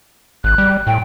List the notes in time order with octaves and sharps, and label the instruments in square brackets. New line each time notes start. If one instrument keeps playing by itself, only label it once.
[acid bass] G#1 [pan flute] F#6
[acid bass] G3
[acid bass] A2 [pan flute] G5